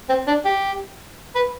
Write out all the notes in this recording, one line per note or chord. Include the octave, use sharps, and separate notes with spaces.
C4
D4
G4
B4